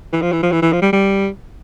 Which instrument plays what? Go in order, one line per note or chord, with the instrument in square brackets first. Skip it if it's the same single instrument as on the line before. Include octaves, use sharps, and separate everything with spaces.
[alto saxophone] E3
F3
E3
F3
E3
E3
F3
G3
G3